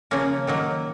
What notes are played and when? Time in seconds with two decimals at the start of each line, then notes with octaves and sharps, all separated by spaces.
0.11 C#3 F3 A#3 C#4
0.47 D#3 F#3 A#3